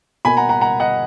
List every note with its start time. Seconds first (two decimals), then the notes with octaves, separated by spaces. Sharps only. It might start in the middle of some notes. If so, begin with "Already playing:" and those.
0.25 B2 A#3 G#5 B5
0.37 F#5 A#5
0.49 F#5 A#5
0.61 F#5 A#5
0.80 D#5 F#5